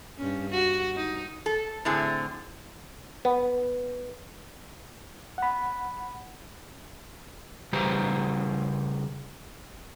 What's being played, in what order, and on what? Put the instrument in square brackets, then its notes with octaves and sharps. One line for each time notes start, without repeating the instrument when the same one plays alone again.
[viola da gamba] G2 C#4
F#4
D#4
[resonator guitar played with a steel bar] A4
A2 D3 C4 G#4
[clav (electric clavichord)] B3
[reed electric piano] F#5 B5
[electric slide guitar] C#3 G3 G4 B4 C5 A#5